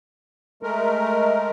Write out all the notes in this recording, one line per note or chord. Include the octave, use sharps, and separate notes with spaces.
G#3 A3 A#4